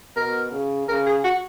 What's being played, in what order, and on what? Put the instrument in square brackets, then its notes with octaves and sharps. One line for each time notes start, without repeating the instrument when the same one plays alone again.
[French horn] B2 [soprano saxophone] A#4
[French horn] C#3
[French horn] C#3 [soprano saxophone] A#4
[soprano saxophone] G#4
F#4